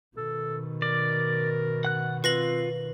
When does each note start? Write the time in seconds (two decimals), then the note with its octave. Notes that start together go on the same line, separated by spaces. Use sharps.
0.17 B2 D#3 A4
0.82 A#4 D5
1.85 F#5 F#6
2.24 C4 F4 B4 A#6 F#7